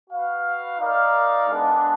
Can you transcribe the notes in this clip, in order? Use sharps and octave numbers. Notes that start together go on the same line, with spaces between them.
F#4 B4 F5
D#4 A#4 D5 F5
G#3 B3 D4